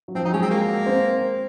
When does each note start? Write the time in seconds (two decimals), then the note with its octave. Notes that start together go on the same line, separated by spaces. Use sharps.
0.08 F#3
0.15 F3 C4
0.25 F#3 D#4
0.33 G#3 C#4
0.42 C4
0.51 A#3
0.86 C4